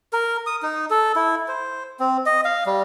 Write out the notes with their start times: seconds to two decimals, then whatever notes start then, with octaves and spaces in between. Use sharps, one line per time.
0.13 A#4
0.47 D#6
0.63 D#4
0.90 A4
1.16 E4
1.48 C5
2.00 C4
2.26 D#5
2.45 F5
2.66 G3